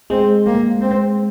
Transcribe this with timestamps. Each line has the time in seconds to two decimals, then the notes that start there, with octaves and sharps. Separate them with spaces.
0.10 G#3 C4
0.46 A#3
0.81 C4